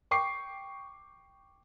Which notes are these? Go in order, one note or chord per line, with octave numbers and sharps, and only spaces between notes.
G5 C#6 D6 C7